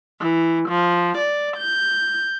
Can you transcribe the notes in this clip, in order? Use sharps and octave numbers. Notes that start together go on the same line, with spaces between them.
E3
F3
D5
G6